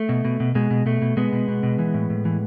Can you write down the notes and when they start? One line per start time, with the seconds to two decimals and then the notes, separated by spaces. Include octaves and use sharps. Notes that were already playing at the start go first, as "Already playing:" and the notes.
Already playing: A3
0.09 B2
0.25 B2
0.40 B2
0.55 B2 G#3
0.71 B2
0.86 B2 A3
1.02 B2
1.17 B2 G#3 B3
1.33 B2
1.48 B2
1.63 B2
1.79 E3
1.94 A2
2.10 A2
2.25 E3